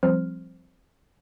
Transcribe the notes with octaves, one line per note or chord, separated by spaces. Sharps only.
F3 G3 C4 C5 F6